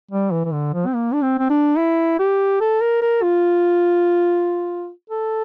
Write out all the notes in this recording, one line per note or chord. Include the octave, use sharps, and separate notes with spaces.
G3
E3
E3
D3
F3
C4
A#3
D4
C4
C4
D4
E4
G4
A4
A#4
A#4
F4
A4